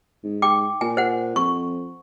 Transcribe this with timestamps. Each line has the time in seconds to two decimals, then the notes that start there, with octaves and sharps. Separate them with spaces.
0.24 G#2
0.42 G5 D6
0.81 A#2 G#5
0.97 C5 F#5
1.36 F2 C#6